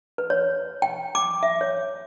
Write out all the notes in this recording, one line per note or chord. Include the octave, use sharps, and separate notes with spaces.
B4
C#5
G5
D6
E5
C#5